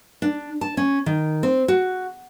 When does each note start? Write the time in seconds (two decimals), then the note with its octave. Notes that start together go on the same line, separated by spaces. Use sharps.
0.22 D4
0.61 A5
0.77 C#4
1.06 D#3
1.43 C4
1.68 F#4